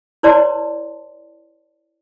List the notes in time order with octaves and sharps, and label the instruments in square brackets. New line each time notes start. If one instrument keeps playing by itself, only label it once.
[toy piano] E4 B4 C#5 D5 A5 C6